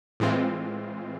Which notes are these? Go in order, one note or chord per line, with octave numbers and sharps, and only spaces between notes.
A2 E3 G#3 C4 F4